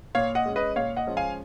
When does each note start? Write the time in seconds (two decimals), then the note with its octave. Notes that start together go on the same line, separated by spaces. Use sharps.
0.15 A#2 C#5 F5
0.35 D#5 F#5
0.46 G#3 C#4
0.56 B4 D#5
0.76 A#2 C#5 F5
0.97 D#5 F#5
1.07 F3 G#3 C#4
1.17 F5 G#5